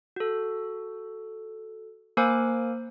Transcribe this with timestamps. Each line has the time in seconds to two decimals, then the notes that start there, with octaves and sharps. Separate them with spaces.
0.16 F#4 A4
2.17 A#3 A#4 C5 G#5 D6 F#6